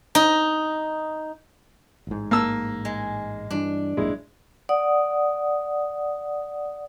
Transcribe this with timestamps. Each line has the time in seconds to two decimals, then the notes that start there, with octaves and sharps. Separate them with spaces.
0.15 D#4
2.07 A1 G#2
2.31 A#3 A5 E6
2.85 G#3
3.50 G2 E3 D4
3.97 A1 F#2 A#2 G#3 E4
4.69 D5 F#5 D#6